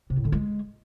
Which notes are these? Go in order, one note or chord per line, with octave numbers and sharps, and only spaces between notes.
C3
A2
D3
G#3